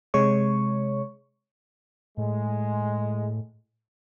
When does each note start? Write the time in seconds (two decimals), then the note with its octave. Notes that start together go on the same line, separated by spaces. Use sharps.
0.14 C3 G#3 C#5 C#6
2.17 A2 G#3